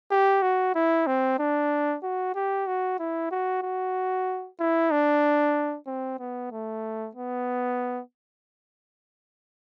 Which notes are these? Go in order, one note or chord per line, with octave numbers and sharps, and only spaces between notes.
G4
F#4
E4
C4
D4
F#4
G4
F#4
E4
F#4
F#4
E4
D4
C4
B3
A3
B3